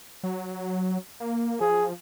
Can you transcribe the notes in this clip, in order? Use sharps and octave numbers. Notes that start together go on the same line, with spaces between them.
F#3
A#3
F3 G#4